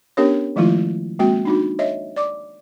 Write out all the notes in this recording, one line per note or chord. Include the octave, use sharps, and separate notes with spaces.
B3 C#4 D4 G4 A#4 C#5
D#3 F3 G#3 A3 E4 F4
G#3 A#3 C4 F#4 G5
D4 D#4 F#4
C#5 D#5 E5
D5 D6